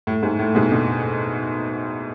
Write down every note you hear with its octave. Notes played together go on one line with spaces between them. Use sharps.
A2
G#2
A2
G#2 B2
B2 D3